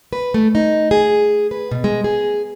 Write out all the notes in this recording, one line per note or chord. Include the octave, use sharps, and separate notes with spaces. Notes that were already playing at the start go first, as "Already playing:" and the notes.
B4
A3
D#4
G#4
B4
B2
G#3
G#4